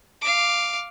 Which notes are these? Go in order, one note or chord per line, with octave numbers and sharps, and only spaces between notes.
F5 D6